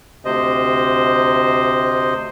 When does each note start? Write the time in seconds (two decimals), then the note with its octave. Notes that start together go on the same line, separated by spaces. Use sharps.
0.25 D2 C3 C5 D#5